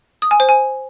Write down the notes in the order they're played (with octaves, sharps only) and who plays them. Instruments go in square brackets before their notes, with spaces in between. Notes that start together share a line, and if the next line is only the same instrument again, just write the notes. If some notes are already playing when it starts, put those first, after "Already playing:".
[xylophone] D#6
G#5
C5
G#5